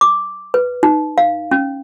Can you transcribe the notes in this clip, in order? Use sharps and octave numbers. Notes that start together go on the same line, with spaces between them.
D6
B4
D#4
F5
C#4